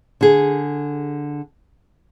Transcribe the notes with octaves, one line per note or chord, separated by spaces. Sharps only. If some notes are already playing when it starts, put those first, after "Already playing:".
D3 G#4